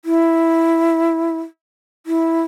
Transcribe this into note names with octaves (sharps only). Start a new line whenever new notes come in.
E4
E4